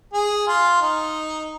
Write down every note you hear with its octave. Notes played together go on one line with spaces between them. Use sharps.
G#4
F4
D#4